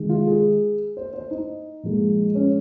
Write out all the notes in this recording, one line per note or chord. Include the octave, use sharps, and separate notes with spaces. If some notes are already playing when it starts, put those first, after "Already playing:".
Already playing: C3 D#3 G#3
F4
G#4
C5
C5
D#4
A#2 F3 G#3
C#4